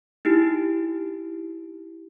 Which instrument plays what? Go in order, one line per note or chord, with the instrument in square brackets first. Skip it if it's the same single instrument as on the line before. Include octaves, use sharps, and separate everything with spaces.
[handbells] D#4 E4 G4 D7